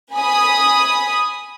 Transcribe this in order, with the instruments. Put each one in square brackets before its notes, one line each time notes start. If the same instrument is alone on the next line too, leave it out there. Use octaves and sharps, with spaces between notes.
[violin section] G#5 B5 D#6